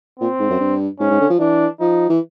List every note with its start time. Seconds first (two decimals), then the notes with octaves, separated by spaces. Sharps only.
0.20 A#2 C4
0.40 G#2
0.50 F#2
0.60 G2
1.00 G#2 C#4
1.11 G#2
1.21 D3
1.30 F3
1.39 E3 D4
1.80 F3 D#4
2.09 E3